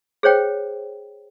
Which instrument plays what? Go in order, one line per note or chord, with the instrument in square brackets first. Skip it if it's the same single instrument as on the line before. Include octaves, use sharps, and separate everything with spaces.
[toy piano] G#4 C5 C#5 G5